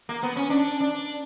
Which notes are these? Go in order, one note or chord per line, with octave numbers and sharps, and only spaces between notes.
A#3
B3
C#4
D4
D4